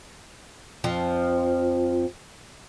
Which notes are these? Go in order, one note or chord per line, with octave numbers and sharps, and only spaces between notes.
F2 F3